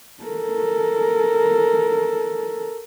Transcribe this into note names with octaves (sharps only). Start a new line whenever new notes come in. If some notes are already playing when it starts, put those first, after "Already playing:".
A4 A#4